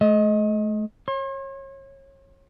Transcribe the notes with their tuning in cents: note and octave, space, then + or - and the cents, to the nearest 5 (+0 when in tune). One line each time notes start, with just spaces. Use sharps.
A3 -40 D#5 +15
C#5 -30 C6 +40